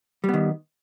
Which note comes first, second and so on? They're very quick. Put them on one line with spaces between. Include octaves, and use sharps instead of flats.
G3 B3 D#3